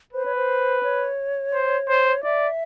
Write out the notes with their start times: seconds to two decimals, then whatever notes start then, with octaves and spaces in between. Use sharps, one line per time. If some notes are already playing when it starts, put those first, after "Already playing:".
0.13 B4 C5
0.25 C#5
0.36 C5
0.83 C#5
1.53 C5
1.89 C5
2.23 D5 E5